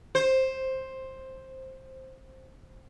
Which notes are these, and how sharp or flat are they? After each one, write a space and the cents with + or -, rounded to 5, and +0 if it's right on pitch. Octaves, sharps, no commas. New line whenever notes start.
C5 +10